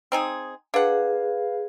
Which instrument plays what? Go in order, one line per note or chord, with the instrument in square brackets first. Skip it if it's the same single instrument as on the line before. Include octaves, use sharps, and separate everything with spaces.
[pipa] C4 D#4 G#4
[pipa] D4 F#5 [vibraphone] G#4 [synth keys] B4 F5